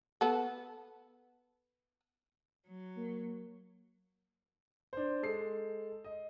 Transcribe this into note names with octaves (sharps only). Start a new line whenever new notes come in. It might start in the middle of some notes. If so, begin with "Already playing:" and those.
B3 A4
F#3
A#3
D4 C5
G#3 A4 C7
D#5